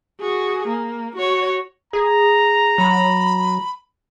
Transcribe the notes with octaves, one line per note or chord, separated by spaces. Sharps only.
F#4 G#4
A#3
F#4 C#5
G#4 A#5
F#3 B5